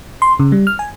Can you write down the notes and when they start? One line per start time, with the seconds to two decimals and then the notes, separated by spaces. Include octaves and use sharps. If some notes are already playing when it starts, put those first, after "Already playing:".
0.22 C6
0.39 C#3
0.52 G3
0.67 F6
0.79 G#5